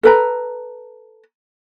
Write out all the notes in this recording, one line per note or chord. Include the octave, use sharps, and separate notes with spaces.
A4 B4 A#5